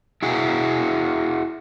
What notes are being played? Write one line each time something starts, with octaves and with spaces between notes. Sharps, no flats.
E4 F#4 G#4